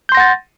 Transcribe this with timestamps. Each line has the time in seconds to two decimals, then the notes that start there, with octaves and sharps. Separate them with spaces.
0.09 G6
0.12 C6
0.15 A#6
0.17 F#5
0.20 A6